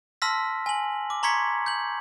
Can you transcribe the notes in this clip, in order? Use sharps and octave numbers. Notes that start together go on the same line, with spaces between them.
A5 C6 E6 F6 A#6 B6
G#5 F#7
D6
A#5 C6 C#6 G#6 B6 C#7
G6 F#7